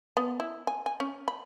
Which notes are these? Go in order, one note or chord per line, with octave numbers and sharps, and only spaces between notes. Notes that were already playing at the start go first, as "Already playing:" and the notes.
B3
E4
G#5
G#5
C#4
B5